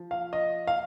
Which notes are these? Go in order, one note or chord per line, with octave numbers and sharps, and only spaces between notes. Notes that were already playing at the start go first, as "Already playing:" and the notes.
Already playing: F3
F5
D#5
F5